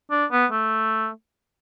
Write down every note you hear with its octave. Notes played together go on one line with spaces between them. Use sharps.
D4
B3
A3